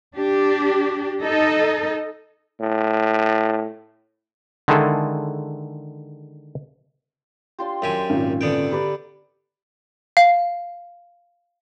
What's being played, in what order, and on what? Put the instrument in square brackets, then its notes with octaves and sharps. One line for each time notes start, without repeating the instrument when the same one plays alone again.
[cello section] D4 G4
D#4 A4 D#5
[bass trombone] A2
[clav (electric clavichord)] D3 D#3 G#3 E4 G#4 A4
[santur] D4 F4 G4 [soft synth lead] C6
[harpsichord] F#2 G4 G#5 [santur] E5
[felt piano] G#1 A#2 [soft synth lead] C#4
[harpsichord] D3 B3 G5
[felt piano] G4 [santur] A#4 B4 D5
[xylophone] F5